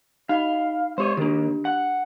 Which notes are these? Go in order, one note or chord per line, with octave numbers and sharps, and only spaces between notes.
D#4 D#5 F5 B5
G#3 G4 C5 C#5 D#7
D#3 A#3 D4 G4
F#5